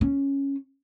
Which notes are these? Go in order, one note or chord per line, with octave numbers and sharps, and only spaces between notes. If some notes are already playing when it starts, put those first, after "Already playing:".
C#4